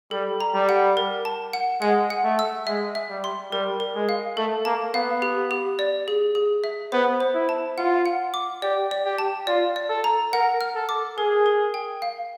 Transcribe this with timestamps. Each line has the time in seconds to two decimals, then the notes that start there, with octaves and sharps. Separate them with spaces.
0.11 G3 A4
0.40 A#5
0.54 G3
0.69 F#5
0.97 A#4
1.25 A5
1.53 F#5
1.82 G#3 F#5
2.10 F#5
2.24 A3
2.39 E6
2.67 G#3 E5
2.95 E5
3.09 G3
3.24 C6
3.52 G3 A#4
3.80 A#4
3.95 G#3
4.09 F5
4.37 A3 A4
4.65 A#3 A5
4.94 B3 F5
5.22 G4
5.51 G4
5.79 D5
6.08 G#4
6.35 G#4
6.64 E5
6.92 B3 C5
7.20 C5
7.34 E4
7.49 A5
7.78 F4 F#5
8.06 F#5
8.34 D6
8.62 G4 D5
8.91 D5
9.05 G4
9.18 A5
9.47 F4 D5
9.76 D5
9.90 A4
10.04 A#5
10.33 A#4 F#5
10.61 F6
10.75 A4
10.89 D6
11.17 G#4 A#4
11.46 A#4
11.74 G5
12.02 F5